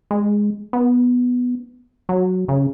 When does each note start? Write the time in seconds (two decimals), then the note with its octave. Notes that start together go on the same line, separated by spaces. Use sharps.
0.11 G#3
0.73 B3
2.09 F#3
2.48 C#3